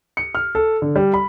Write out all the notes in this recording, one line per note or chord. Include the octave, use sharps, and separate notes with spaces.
C#7
F6
A4
D3
G3
B5